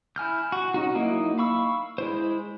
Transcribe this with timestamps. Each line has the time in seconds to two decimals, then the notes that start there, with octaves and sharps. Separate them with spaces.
0.16 E4 G#5 F6 G6
0.52 F#4
0.74 C#4 D#4 F#4
0.95 F#3 A#3 D#4 E4
1.38 F5 B5 C#6 E6
1.98 G#3 E4 C5